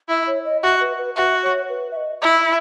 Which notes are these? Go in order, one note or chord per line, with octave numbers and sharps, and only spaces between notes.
E4 E5
C#5
D#5
F#4 E5
B4
B4
F#4 E5
C#5
B4
E5
D#5
E4 E5